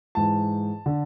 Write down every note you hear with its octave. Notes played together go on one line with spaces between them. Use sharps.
G#2 E3 A5
D3